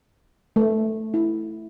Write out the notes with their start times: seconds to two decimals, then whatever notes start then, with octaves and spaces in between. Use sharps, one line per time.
0.56 A3
1.14 E4